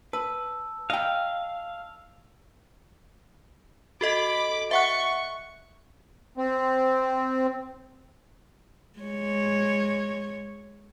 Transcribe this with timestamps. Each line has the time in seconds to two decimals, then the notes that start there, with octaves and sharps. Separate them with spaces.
0.13 B4 A5 E6
0.90 D#5 F5 G5
4.01 F#4 A4 D#5 B5 D6
4.71 E5 F#5 C#6 F#6
6.38 C4
8.99 G#3 C#5